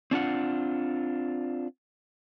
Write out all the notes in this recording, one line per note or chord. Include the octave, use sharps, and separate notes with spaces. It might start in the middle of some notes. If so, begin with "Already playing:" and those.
C4 D4 F4 F#5